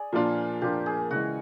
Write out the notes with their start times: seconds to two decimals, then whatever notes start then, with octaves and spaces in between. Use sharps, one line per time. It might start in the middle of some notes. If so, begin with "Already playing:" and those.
Already playing: G#4 D5
0.13 A#2 F3 A#3 D4 F4
0.61 A#2 F3 A#3 D4 F4 G4
0.86 G#4
1.11 C#3 E3 G#3 F#4